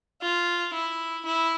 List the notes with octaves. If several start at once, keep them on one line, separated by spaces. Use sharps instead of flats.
F4
E4
E4